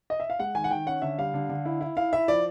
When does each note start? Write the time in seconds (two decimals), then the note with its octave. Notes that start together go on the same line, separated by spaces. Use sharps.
0.10 D#5
0.20 E5
0.30 F5
0.39 G#3 F#5
0.55 D#3 G#5
0.64 F#5
0.71 D#3 G5
0.86 C#4 F#5
1.02 D3 E5
1.18 G3 F5
1.34 D3
1.49 D3
1.65 E4
1.81 E4
1.97 E4 F5
2.13 E4 E5
2.28 F3 D5